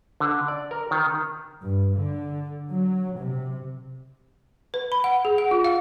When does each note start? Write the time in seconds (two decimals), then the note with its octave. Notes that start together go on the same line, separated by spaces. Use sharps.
0.20 D3
0.48 D5
0.71 A#4
0.91 D#3
1.62 G2
1.95 D3
2.72 F#3
3.19 C3
4.74 B4
4.92 B5
5.04 F#5
5.25 G#4
5.38 F#5
5.51 F4
5.64 F5